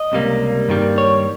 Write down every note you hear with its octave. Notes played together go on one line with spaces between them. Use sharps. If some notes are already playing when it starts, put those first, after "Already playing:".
Already playing: D#5
C#2 C3 G3 A#3
G2 D#3 G3 A#3
C#5